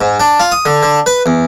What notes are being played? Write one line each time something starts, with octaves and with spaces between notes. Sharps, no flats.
G#2
D4
F4
D#6
D3
D3
B4
E2